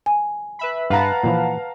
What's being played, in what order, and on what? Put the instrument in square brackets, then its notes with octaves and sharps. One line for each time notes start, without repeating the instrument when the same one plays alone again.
[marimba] G#5
[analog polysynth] B4 E5 B5
[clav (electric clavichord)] G2 [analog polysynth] B4 F#5 A5 [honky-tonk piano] F5 A#5
[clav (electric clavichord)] A#2 E3 F3